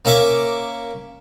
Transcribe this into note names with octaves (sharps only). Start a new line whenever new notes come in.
A#3 C#4 E5 C#6 D6